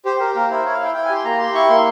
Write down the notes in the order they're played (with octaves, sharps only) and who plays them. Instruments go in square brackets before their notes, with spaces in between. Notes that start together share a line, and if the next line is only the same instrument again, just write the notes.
[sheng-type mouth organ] G4 C5
G4 A#4
A#3 A#4
E4 C5
E4 C#5
F5
E4 G5
E4 G5
G#5
G4
C6
A#3 A#5
G4 C6
E4 C#6
A#3 C6